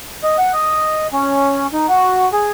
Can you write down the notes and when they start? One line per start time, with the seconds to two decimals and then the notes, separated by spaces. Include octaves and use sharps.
0.23 D#5
0.38 F#5
0.53 D#5
1.13 C#4
1.73 D#4
1.88 F#4
2.33 G#4